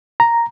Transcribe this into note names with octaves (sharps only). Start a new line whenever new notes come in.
A#5